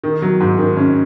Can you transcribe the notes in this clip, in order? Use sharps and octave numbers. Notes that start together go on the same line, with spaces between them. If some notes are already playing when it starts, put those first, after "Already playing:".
D#3
F#3
G#2
D#3
C#4